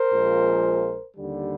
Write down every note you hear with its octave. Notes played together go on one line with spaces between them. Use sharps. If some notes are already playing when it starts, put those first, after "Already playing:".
Already playing: A#4 C5
A#1 A#2 F3 G#3
D#2 D3 G3